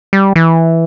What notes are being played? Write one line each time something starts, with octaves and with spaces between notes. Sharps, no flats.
G3
E3